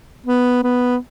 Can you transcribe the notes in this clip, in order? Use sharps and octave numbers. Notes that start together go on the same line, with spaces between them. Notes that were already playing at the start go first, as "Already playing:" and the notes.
B3
B3